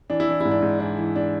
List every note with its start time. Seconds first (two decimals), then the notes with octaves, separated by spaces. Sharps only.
0.10 E3 D4
0.20 E4
0.27 E3 D4
0.41 G#2 E4
0.51 D4
0.62 G#2
0.80 E3 D4
0.98 E3
1.16 D4